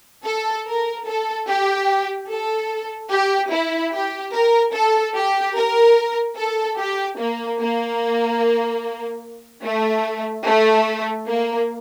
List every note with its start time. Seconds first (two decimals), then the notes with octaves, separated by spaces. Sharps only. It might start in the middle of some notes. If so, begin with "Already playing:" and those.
0.25 A4
0.67 A#4
1.06 A4
1.47 G4
2.29 A4
3.11 G4
3.51 E4
3.92 G4
4.33 A#4
4.74 A4
5.15 G4
5.56 A#4
6.37 A4
6.78 G4
7.18 A#3
7.59 A#3
9.63 A3
10.45 A3
11.27 A#3